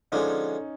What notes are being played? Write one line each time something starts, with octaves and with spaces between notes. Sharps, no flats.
D3 F3 G#3 C#4 D#4